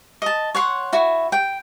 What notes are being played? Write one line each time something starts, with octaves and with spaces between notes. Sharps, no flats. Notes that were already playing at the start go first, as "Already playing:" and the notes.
D#5 A5
C#5 F#5 C6
E4 F#4
G5